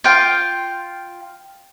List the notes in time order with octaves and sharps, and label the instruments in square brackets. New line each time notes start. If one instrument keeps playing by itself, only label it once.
[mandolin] F4 G5